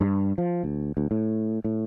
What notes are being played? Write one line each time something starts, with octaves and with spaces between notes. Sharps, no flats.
G2
F3
D2
D2
A2
A2